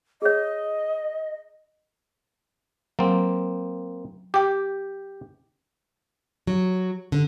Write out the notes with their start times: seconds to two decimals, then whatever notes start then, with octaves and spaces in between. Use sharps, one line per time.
0.22 G#4 C#5 D#5
2.99 F#3 A#3 C4
4.34 G4 G5 D6
6.47 F#3
7.12 D3